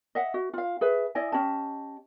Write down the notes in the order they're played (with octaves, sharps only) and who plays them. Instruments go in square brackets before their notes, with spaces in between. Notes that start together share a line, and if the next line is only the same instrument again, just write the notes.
[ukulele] D#5 E5 F#5
F#4
F4 F5
G#4 B4 E5
E4 D5 D#5 G#5
C#4 G4 D#5 A5